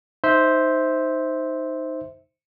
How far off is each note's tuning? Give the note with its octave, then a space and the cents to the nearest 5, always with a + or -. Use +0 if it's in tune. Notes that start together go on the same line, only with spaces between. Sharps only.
D#4 +0 C5 +0 E5 -15